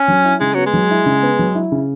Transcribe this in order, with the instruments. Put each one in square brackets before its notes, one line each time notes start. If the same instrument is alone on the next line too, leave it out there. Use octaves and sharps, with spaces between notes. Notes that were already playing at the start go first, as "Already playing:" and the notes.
Already playing: [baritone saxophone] C#4
[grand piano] F#3
E4
[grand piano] C#3 [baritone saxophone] G#3
[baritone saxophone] F#3 [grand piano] B3
[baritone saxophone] G#3
[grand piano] F#3
E4
C#3
B3
F#3
E4
C#3